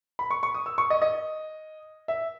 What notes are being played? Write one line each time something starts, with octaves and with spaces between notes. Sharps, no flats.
B5
C#6
C#6
D#6
E6
C#6
D#5
D#5
E5